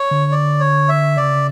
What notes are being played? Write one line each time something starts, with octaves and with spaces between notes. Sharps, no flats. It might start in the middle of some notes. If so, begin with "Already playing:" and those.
Already playing: C#5
D3
D5
C#5
E5
C#3 D5